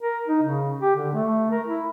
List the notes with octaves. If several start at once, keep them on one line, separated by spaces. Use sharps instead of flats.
A#4
D#4
C#3
G4
D3
A3
A#4
E4